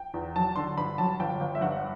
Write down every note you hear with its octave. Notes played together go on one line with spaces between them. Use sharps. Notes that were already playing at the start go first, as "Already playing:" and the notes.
Already playing: G5
E2
F#3 A5
D3 C6
G2 B5
F#3 A5
G1 G5
G1
E5
G2 F#5